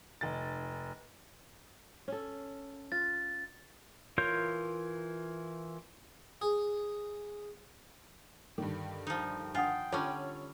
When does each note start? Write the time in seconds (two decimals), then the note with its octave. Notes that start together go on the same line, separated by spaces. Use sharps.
0.21 F1 A6
2.08 C#4 A4
2.92 F4 A6
4.18 E3 F4 A#4 C#5 G6
6.41 G#4
8.58 G2 D3 D#3
9.07 F3 D#4
9.55 D4 F4 F#5 G5 D#6
9.92 D3 G3 C#4 F4 C#5